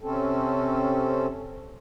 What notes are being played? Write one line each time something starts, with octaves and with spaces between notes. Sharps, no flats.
C3 C4 C#4 A4